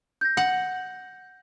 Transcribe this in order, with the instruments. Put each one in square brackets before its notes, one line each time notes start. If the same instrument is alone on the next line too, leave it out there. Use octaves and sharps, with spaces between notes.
[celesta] G6 A#6
[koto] F#5